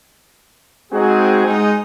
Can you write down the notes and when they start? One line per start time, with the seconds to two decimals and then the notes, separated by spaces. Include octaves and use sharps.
0.92 G#3 C4 D#4 F#4 G#4
1.46 G#3 D#4